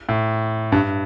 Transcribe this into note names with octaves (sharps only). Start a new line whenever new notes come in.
A2
G2